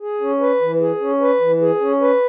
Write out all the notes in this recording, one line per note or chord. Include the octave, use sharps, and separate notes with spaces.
G#4
C#4
B4
E3
G#4
C#4
B4
E3
G#4
C#4
B4